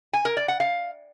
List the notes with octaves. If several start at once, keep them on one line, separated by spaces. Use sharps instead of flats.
G#5
A#4
D5
F#5
F5